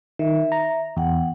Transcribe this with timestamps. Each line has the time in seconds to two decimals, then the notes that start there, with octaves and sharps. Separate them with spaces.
0.19 D#3 E5
0.52 A#5
0.97 E2 F#5 G5